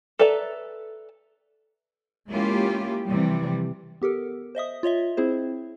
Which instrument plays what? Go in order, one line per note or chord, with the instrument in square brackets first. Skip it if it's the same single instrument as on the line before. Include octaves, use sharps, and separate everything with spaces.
[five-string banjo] A4 B4 D5 E5 A#5
[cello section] G#3 A#3 C#4 E4 F4 G4
C3 E3 F3 G3
[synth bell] B3 G4 A4 A#4
C5 D#5 E5 D#6
F4 C#5 D#5 E5
C4 E4 G#4 C5